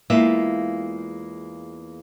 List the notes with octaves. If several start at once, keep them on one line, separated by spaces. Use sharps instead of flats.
E2 G#3 A#3 F4 E5